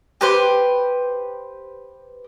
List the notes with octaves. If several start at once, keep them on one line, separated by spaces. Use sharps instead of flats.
G4 B4 C5